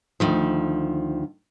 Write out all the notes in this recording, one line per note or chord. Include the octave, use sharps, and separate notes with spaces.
D2 D#3 F3